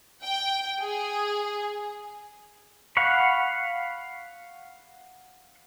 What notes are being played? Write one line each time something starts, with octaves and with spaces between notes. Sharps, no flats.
G5
G#4
F5 F#5 B5 C#6